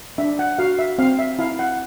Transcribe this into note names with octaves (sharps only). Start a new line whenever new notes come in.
D4 E5
F#5
F#4 F5
E5
C4 F5
E5
E4 F5
F#5